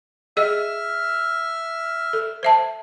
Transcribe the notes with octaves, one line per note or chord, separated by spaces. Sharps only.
G#4 D#5 E5 F6
A4
C5 E5 A5